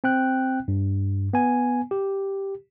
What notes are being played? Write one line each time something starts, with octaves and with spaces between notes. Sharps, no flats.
C4 G5 F#6
G2
B3 G#5
G4